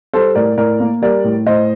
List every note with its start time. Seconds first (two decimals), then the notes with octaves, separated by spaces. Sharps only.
0.14 G3 A4 C5
0.35 A2 A#4 D5
0.57 A2 A#4 D5
0.80 A#3
1.02 G3 A#4 D5
1.24 A2
1.46 A2 C5 D#5